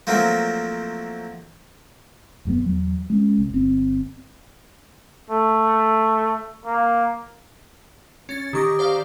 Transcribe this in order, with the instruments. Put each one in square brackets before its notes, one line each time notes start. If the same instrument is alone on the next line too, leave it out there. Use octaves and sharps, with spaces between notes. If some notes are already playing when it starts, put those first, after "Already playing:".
[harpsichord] F3 F#3 A3 A#3 C4
[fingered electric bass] D#1 F#2 G3 B3
E2 F#3
G#3 C#4
C2
G1 C4
[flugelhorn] A3
A#3
[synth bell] C#4 A6
[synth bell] D#3 C#6 A#6 [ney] G4
[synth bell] C5 D5 F5